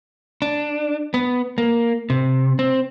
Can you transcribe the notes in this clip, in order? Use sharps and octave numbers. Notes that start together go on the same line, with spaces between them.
D4
B3
A#3
C3
C4